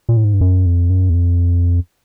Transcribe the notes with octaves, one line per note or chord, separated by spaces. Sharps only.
A#2
A2
G#2
G2
F#2
F2
F#2
E2
F2